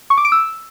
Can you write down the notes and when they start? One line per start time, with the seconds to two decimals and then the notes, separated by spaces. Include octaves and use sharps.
0.10 C#6
0.17 D6
0.25 D7
0.32 E6